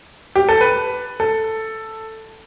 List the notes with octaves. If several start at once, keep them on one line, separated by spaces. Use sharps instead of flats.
G4
A4
B4
A4